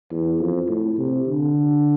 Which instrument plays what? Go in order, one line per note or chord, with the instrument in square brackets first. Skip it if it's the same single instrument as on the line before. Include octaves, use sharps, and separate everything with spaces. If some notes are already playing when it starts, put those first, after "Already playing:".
[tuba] E2
F2
A2
C3
D3